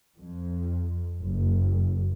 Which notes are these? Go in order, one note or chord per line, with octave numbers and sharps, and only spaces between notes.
F2
F#1